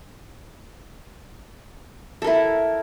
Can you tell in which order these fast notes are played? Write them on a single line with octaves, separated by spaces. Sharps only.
A4 A#4 E4